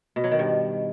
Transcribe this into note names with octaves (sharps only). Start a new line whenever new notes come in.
B2
F#3
D#3
G2